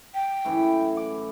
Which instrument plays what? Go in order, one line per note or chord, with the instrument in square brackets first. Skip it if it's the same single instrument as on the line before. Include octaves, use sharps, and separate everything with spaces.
[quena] G5
[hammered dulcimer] F#2 A2 E3
F#5 D6